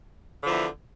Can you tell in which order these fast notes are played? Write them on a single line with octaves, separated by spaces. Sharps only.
D3 F3 E2 E3